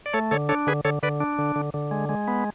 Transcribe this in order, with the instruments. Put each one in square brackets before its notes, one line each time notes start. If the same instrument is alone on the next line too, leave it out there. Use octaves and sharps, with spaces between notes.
[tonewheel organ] D5
A3 A4 C#5
D3 A4 C#5
D4 A4 C#5
D3 G#4 B4
D3 A4 C#5
D3 B4 D5
D4
D3
D3
D3
G#3
G#3
B3